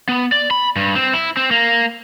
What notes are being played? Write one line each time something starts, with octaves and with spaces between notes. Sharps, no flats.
B3
D5
B5
G2
C4
E4
C4
A#3